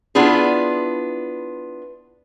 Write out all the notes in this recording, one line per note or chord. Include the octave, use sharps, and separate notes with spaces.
B3 D4 E4 F4 G#4